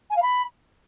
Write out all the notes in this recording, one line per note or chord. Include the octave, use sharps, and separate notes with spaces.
G#5
F5
B5